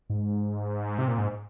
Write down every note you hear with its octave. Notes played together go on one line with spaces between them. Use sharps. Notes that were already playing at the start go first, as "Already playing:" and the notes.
G#2
C3
A#2
G#2